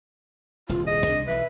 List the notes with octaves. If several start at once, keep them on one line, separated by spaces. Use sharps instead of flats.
D#1 C2 F4
G#4 D#5
C2 C3 D4
B1 E3 B4 E5